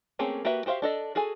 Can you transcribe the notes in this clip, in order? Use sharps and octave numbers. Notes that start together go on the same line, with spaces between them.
A3 A#3 C4 C#4 G#4
A#3 F#4 G4 B4 E5
F#4 G4 C5 E5 F5
D4 A4 D#5
F#4 G#4 A4 G#5